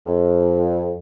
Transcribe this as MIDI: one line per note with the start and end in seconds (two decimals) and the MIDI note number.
0.07 0.97 41